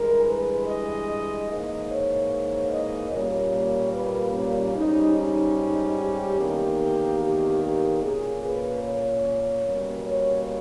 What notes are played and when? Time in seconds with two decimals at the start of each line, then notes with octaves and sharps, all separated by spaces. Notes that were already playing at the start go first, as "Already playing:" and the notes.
Already playing: G2 E3 G#3 A#4
0.25 B4
0.66 D#5
1.48 G#2 E3 A#3 D#5
1.89 C#5
2.70 D#5
3.11 A#2 G3 A#3 C#4 C#5
3.92 B4
4.33 C#4
4.75 G#2 G3 C#4 D#4
5.15 D#4
5.56 D#4
5.97 G4
6.38 E2 D#3 A#3
7.20 G4
7.60 G4
8.01 A#2 A#3 C#4 G#4
8.42 B4
8.82 C#5
9.64 B2 G3 A#3 C#4
10.05 C#5